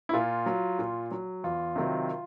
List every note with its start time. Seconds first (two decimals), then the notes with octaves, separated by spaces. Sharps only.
0.09 E4
0.13 A#2 F4
0.46 F#3
0.79 A#2
1.11 F#3
1.44 E2 F4
1.76 C3 D#3 F#3